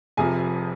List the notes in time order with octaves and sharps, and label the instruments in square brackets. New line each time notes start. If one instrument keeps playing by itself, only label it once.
[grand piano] F1 F2 C3 F3 G#4 G#5